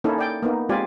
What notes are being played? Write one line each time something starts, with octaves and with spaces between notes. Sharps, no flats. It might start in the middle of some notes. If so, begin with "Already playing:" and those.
A#3 C#4 D#4 E4 A4
D5 G5
A#3 B3 D#4
G#3 C4 F4 G4 D5 G#5